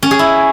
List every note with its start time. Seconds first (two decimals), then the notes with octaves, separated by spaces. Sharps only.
0.03 C#4
0.11 G#4
0.19 E4